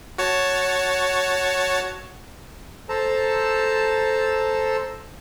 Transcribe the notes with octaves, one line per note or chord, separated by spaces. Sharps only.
F#4 C#5 A5
A4 C5 A5 A#5